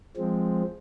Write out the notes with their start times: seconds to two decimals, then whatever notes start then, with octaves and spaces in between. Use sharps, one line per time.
0.17 F3 G#3 C4